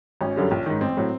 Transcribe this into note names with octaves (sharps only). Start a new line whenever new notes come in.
G#1 C#4
F#2 D3 G3
A#1
G#2 D#3
A1 C4
A2 F#3